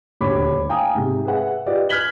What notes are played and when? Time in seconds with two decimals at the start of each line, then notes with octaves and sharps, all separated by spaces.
0.21 D#1 D2 G4 C#5 B5 D6
0.69 F5 G5 G#5 A#5 D#6
0.95 G#2 C3
1.25 G#4 B4 E5 F#5
1.66 F4 G4 B4 D5 D#5
1.89 F6 F#6 G#6 B6 F#7 G7